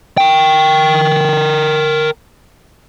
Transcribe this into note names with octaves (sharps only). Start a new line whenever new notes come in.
A#4 G5